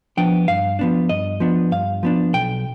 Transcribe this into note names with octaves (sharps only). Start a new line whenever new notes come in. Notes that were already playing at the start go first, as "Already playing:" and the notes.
F3 B3 D4 G5
G2 F5
F3 B3 D4
G2 D#5
F3 B3 D4
G2 F5
F3 B3 D4
B1 G5